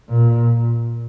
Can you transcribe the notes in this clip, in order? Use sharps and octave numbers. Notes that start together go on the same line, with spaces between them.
A#2